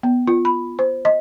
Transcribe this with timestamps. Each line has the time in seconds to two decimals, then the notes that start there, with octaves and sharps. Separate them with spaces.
0.03 B3
0.27 F4
0.45 B5
0.79 C5
1.05 D#5